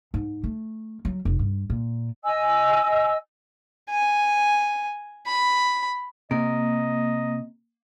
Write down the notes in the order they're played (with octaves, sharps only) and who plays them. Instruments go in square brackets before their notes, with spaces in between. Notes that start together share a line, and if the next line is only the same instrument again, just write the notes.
[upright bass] G#2
A3
F#3
F1
G2
A#2
[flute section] D#5 G#5 E6
[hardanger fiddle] G#5
B5
[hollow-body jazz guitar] C3 [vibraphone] A#3 [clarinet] D#5